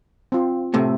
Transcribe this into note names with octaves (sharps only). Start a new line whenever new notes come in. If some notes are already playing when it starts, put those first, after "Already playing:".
C4 F4
A2 C3 A3